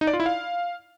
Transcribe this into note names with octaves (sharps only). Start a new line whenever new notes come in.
D#4
D5
F4
E4
F5